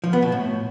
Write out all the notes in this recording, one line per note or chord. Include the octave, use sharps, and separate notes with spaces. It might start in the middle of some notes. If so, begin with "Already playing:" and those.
F3
B3
B2
A2